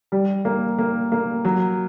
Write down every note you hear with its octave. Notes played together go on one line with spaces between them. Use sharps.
G3
A#3
A#3
A#3
F#3